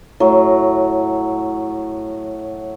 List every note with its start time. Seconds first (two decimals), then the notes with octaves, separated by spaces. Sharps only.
0.20 A2 F#3